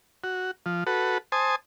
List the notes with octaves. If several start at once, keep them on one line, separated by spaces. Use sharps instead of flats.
F#4
F3
F#4 A4 B4
C5 G#5 A5 D#6